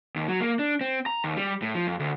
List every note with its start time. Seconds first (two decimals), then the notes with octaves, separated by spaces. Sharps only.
0.16 D#2
0.28 F#3
0.40 A#3
0.59 D4
0.81 C4
1.06 A#5
1.24 D#2
1.37 G3
1.62 A2
1.75 F3
1.87 F2
2.00 D2